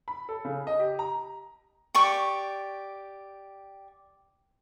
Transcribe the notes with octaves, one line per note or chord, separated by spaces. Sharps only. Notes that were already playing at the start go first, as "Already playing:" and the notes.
B5
A4
C#3
D#5
G4
A#5
G4 D5 C#6